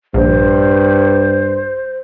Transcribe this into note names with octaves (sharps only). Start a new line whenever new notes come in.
A#1 G2 C5